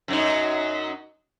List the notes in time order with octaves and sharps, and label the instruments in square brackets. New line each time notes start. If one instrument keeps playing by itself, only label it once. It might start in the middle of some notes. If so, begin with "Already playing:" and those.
[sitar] F#2 F#3 D#4